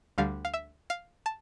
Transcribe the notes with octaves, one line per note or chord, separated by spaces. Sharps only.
D2 D3 G3 F5
F5
E5
F5
A5